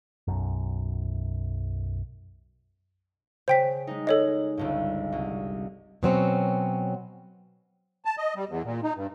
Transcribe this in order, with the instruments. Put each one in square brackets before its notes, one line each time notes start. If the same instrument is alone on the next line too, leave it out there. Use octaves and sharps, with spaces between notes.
[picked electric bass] B1 F#2
[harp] C#3 [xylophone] C5 G5 B6
[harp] G#3 D#4
[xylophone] A4 C#5 D#5
[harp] G1 C#2 G2
C2
[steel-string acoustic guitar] B2 F#3 C4 C#4
[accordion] A5
D#5
G3
E2
A#2
D#4
G2